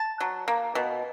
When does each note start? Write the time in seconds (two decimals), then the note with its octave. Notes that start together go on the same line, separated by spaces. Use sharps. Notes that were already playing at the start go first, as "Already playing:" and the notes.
Already playing: A5
0.20 F#3
0.48 A#3
0.75 B2